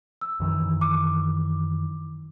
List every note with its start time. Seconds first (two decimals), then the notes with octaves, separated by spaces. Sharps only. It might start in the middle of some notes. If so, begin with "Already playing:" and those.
0.21 E6
0.40 F#2 D#3 E3
0.81 D6